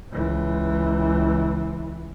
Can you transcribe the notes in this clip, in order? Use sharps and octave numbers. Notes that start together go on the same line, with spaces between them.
C#2 E3